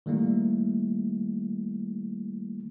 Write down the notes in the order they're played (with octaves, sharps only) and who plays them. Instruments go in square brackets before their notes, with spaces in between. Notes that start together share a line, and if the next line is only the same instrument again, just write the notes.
[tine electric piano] D#3 G3 A3 A#3 E4